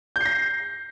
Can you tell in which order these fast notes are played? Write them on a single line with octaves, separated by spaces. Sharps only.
G6 C7 A#6